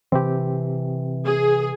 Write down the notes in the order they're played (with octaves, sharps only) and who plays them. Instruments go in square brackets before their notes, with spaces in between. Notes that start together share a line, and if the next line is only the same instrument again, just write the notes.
[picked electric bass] C3 E3 [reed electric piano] C4 G4
[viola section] G#4